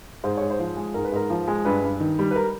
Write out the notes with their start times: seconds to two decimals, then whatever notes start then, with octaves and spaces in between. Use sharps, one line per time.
0.24 G#2 C5
0.37 G#2 C#5
0.50 C5
0.59 F3
0.76 G#3
0.94 G#2 A#4
1.05 B4
1.12 G#2 A#4
1.30 F3
1.47 G#3
1.65 G2 B4
1.83 G2
2.00 D#3
2.19 G3
2.31 B4
2.36 A#4